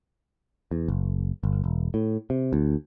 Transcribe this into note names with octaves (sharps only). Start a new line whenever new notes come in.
E2
F#1
G1
E1
A2
C3
D2